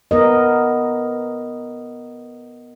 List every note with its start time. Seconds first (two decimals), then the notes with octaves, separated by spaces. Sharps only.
0.11 B3 A#4 D#5